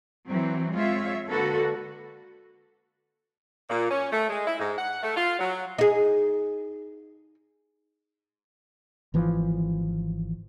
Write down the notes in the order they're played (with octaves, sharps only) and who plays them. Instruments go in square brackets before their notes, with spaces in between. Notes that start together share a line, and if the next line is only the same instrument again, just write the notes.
[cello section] E3 F#3 C4
G#3 C4 F4 C#5 E5
D3 A#3 F#4 A4 B4
[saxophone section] A#2
C#4
A3
G#3
E4
G#2
F#5
A3
F4
F#3
[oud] D#4 G#4
[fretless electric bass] G#1 E3 F3